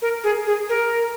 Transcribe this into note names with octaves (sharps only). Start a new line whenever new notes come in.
A#4
G#4
G#4
A#4